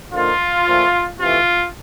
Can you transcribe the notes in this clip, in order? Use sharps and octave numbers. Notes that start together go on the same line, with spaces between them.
D3 F3 A#3 D#4 F4
A#2 F3 A3
C3 E3 A3 F4